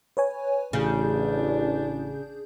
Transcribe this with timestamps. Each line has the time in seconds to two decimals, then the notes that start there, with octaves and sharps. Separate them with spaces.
0.17 B4 C#5 G#5
0.73 A1 C#3 D4 G#4 G6